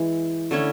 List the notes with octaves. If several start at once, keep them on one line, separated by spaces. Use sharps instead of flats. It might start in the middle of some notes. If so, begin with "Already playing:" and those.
Already playing: E3 G#3
D3 A3 C#4 E4